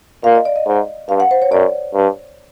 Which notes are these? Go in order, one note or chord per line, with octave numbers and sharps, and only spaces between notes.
A#2 F5
D#5
D5
D#5
G#2
G2 F5
F#5
C5
C#5
F#2 D5
G2